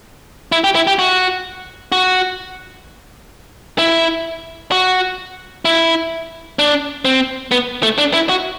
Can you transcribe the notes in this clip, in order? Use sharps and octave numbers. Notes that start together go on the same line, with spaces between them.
E4
G4
E4
G4
F#4
F#4
E4
F#4
E4
D4
C4
B3
A3
D4
E4
F#4